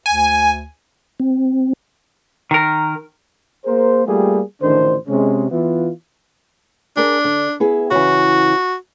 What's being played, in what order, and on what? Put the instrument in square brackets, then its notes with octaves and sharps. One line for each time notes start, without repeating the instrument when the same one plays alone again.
[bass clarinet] D2 [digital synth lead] G#5
[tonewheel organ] C4
[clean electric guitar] D#3 A#4
[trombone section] A#3 G#4 A#4 C5
G3 A3 A#3 F4 G4 G#4
A1 D3 D#3 D4 C5
C3 G#3 C#4
E3 B3 E4 F4
[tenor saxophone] D4 [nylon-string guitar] G#4 A#4 D5
[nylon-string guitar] D3
B3 E4 G#4
[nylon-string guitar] C#3 E3 [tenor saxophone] F#4